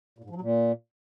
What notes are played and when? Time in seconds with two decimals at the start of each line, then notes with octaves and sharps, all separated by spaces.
0.18 A#2
0.24 G#2
0.30 F3
0.36 F#3
0.41 A#2